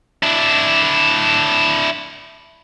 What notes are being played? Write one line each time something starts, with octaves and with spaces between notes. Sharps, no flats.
D4 E4